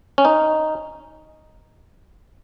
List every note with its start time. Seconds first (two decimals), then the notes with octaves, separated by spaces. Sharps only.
0.18 C#4
0.25 D#4